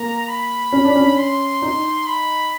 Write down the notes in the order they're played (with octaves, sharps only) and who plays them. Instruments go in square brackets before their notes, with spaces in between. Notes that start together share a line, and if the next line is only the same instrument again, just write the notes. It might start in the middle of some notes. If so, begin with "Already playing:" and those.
Already playing: [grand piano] A#3 [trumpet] A#5
[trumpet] B5
[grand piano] C#4
D4
C#4
[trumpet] C6
[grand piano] D#4
[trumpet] B5